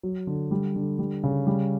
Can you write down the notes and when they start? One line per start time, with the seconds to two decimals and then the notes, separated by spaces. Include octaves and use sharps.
0.03 F#3
0.27 D3
0.51 G3
0.76 D3
0.99 G3
1.24 C#3
1.47 G3